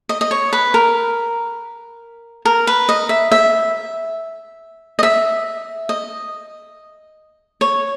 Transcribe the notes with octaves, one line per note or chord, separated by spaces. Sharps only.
D#5
D#5
C#5
B4
A#4
A#4
B4
D#5
E5
E5
D#5
E5
D#5
C#5